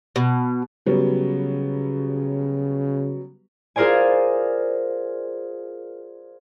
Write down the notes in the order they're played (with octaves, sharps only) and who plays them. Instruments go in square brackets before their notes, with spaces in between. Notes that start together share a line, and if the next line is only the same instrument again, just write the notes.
[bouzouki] B2
[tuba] C#3 [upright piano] F#3 G3 B3
[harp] F4 G#4 A#4 C5 D5 G#5